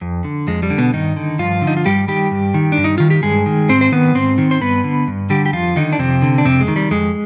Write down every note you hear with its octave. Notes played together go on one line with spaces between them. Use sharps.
F2
D3
F2 G#3
G3
D3
B2 B3
G2 D#3 D#4
D3
G2 F3 F4
D3
D#4
F4
G2 G3 G4
D#3 G3 G4
G2
D#3
D4
G2
D#4
D#3 F4
G4
G2 G#3 G#4
D#3
G#2 C4 C5
C5
D#3 B3 B4
G#2 C4 C5
D#3
C5
G2 B3 B4
D3
G2
D3 G3 G4
G4
F2 F3 F4
D3 D#3 D#4
D4
F2 C3 C4
D3
D4
F2 C3 C4
G#3
D#3
G3
F2 G#3